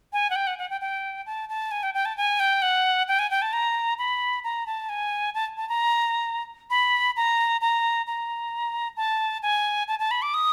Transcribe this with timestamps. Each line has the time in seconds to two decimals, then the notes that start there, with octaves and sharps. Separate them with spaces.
0.13 G#5
0.30 F#5
0.36 G5
0.47 F#5
0.58 F#5
0.70 G5
0.81 G5
1.26 A5
1.49 A5
1.71 G#5
1.83 G5
1.94 G5
2.05 A5
2.17 G#5
2.40 G5
2.62 F#5
3.08 G5
3.19 G#5
3.30 G5
3.42 A5
3.53 A#5
3.98 B5
4.44 A#5
4.66 A5
4.89 G#5
5.34 A5
5.57 A5
5.69 A#5
6.70 B5
7.16 A#5
7.61 A#5
8.07 A#5
8.97 A5
9.42 G#5
9.88 A5
9.99 A5
10.11 B5
10.22 D6
10.34 D#6